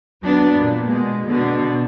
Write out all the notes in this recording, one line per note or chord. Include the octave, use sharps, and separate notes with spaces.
F#3 B3 D4
A#2
B2 G#3
B2 D3 D4